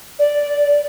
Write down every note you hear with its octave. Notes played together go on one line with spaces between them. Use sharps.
D5